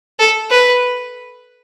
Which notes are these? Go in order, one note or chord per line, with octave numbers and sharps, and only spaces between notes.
A4
B4